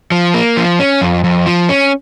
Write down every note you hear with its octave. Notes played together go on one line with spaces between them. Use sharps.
F3
A#3
F3
C#4
F2
F2
F3
C#4